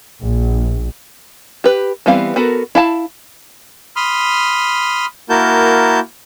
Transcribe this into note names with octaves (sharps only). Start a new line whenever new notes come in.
A#1
G4 B4
E3 G3 B3 C4 F5
B3 F#4 A4 A#4
E4 F5 A5
B5 C6 D#6 F6
A#3 E4 F#4 A#4 A5 G6